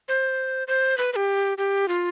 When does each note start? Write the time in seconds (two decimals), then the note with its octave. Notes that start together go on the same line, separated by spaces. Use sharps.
0.08 C5
0.68 C5
0.98 B4
1.13 B4
1.16 G4
1.58 G4
1.88 F4